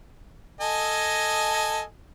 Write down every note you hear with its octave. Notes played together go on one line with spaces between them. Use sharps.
A4 D#5 G#5